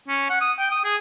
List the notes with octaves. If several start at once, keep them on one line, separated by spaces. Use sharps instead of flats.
C#4
F#5
D#6
G5
D#6
G#4